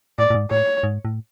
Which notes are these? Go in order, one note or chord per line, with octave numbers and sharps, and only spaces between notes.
A2 D5
A2
G#2
A2 C#5
G#2
A2